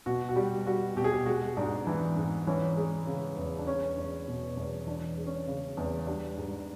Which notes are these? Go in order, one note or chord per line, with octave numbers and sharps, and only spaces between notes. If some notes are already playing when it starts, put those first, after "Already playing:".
B2 F#4
F#4
G3 G4
G3 F#4
B2 G4
G#4
G4
G#3 F#4
G#2 D4
E3
G#2
E3 C#4
G#3
C#3
E2
D4
G#3 C#4
E2
B2
E2
E3 D4
G#3
C#4
C#3 C#4
E2
G3 D4
G#2